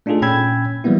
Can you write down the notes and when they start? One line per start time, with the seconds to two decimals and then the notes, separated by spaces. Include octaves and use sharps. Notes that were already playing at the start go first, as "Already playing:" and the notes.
0.06 A3 D4 D#4 F4 G#4 A4
0.22 A#2 C#4 G5 B5 E6 G#6
0.84 E3 F#3 G3 A#3 B3 E4